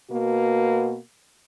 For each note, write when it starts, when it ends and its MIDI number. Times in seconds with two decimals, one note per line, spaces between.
0.11 0.96 47
0.11 0.96 58
0.11 0.96 59
0.11 0.96 66